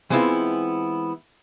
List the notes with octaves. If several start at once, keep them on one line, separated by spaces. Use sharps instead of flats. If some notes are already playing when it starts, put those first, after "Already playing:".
E3 G#3 B3 C4 E4 F4